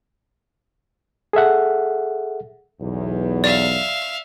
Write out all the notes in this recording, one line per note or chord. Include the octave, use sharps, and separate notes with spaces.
G#4 A4 E5 F#5
B1 E2
D5 E5 F5